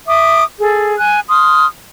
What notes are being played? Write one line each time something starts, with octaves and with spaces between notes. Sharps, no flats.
E5 D6 D#6
G#4 A4
G#5 F#6
C6 D#6 F6